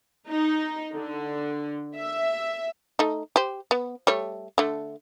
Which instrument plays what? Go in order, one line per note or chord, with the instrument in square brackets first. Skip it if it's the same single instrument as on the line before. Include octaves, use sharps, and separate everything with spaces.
[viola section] D#4
D3
E5
[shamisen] A3 D#4
G4 C5
B3
G3 A3 C#5
D3 A3